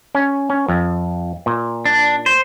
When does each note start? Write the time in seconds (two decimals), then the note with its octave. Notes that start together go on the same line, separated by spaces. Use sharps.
0.15 C#4
0.50 C#4
0.68 F2
1.46 A#2
1.85 D4
2.26 C5